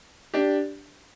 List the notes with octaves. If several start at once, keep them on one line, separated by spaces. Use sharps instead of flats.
D4 G4